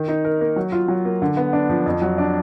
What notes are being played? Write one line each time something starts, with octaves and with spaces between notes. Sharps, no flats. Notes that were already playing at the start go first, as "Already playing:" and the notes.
Already playing: D#3
D#4
A#4
A#3
F#3
F4
F#3
A#3
D3
B3
D4
F3
F2
F#3
D4